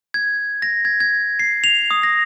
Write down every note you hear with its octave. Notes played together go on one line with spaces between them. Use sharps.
G#6
A#6
G#6
G#6
C7
F7
D#6
A#6